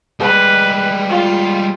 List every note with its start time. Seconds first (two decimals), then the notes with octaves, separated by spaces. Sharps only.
0.20 G3 G#3 B4
1.09 F4